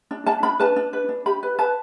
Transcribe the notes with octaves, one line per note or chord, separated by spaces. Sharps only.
D4
D4 A5
D4 B5
B4 A5
D4
B4
D4
G4 B5
B4
B4 A5